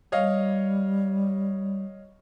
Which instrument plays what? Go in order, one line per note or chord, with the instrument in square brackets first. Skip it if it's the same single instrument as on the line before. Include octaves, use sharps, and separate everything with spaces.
[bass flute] G3 [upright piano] C#5 D#5 F5